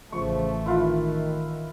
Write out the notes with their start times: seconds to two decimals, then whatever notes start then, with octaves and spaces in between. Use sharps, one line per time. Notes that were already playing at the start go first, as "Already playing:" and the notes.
0.12 A1 C#3 F3 A3 C#6
0.66 D#3 E4 F4 B4